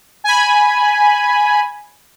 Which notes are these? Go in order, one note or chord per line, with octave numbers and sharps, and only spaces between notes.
G#5 B5